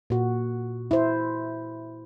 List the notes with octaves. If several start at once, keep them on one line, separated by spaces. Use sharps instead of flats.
A#2 F#4
E4 C5